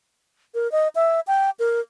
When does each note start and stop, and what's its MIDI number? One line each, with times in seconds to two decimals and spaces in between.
0.55 0.70 70
0.72 0.88 75
0.95 1.20 76
1.27 1.50 79
1.59 1.80 70